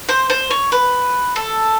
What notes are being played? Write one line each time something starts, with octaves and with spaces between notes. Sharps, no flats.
C5
C5
C#5
B4
A4